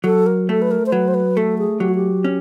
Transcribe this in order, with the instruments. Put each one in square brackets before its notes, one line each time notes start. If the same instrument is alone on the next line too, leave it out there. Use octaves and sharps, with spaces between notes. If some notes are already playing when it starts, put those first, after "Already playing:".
[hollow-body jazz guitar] F#3 [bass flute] A4
[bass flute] A#4
[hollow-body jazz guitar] A3 [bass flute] A4
[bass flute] B4
A#4
C5
[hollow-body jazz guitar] F#3 [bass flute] B4
[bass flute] C5
B4
[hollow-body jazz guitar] A3 [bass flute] A4
[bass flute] G#4
[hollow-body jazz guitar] F#3 [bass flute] G4
[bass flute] F#4
G4
[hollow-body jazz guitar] C#4